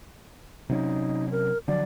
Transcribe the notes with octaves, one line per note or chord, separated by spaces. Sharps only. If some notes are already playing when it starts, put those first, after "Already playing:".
C3 F#3 C#4 D#4
A#4
D3 F3 F#3 D5